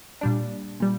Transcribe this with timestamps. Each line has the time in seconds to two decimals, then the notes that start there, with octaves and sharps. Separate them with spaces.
0.21 A#2 G3 D4
0.80 A#2 G3